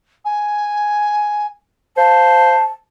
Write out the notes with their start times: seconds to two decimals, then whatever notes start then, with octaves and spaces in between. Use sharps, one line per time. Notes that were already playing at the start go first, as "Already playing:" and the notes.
0.25 G#5
1.97 C5 F5 A5